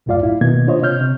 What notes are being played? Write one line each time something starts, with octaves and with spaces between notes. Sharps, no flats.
C2 F#2 A2 F4 D5 F5
E4
B2 D#3 A#3 G#6
D4 F4 C5 C#5 D#5
C3 C#5 F6 G6
C3